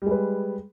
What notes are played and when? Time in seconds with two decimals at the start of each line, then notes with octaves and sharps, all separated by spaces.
0.02 G3
0.06 G#3
0.11 B4